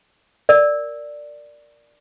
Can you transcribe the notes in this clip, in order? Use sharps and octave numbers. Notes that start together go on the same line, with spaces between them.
A#4 D5